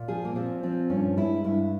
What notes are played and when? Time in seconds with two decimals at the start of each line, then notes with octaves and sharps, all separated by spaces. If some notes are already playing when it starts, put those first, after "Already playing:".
Already playing: A#2
0.08 F3 G#4
0.25 A#3
0.35 A#2 C4
0.63 F3 C4
0.90 G2 C#4
1.17 G#3 E4
1.44 G2 E4